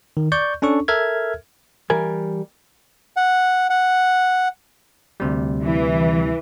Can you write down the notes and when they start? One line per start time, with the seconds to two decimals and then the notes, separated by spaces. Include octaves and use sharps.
0.17 D#3
0.32 D5 C#6 G6
0.62 C#4 D4 A4 C#6
0.88 A4 A#4 E5 F6 G#6
1.90 E3 G3 A#4 G#5
3.17 F#5
3.70 F#5
5.20 D2 C3 G3
5.63 E3